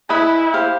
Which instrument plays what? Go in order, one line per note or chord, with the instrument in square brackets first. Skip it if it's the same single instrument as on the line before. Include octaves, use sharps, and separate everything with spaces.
[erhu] E4 [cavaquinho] B4 D#5 G#5
[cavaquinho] G4 C5 F5